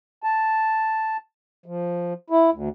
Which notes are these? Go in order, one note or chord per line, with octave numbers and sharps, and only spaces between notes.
A5
F3
E4
D2